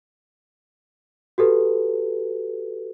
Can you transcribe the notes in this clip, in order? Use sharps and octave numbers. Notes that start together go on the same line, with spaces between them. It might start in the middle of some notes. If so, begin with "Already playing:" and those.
F#4 G4 A4 B4